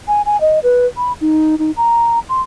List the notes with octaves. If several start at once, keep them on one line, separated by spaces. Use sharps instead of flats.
G#5
G#5
D#5
B4
B5
D#4
D#4
A#5
C6